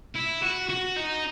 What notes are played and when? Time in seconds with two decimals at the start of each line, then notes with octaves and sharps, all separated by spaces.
0.15 E4
0.42 F#4
0.69 F#4
0.97 D#4